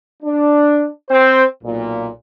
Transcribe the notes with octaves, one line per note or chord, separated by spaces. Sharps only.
D4
C4 C5
B1 A#2